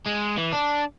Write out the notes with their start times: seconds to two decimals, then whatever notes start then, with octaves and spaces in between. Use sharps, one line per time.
0.06 G#3
0.37 E3
0.52 D4